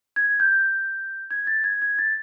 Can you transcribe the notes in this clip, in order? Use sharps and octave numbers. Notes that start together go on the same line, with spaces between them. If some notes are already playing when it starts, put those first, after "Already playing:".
G#6
G6
G#6
A6
G#6
G#6
A6